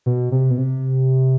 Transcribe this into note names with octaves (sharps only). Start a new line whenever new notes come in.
B2
C3
B2
C3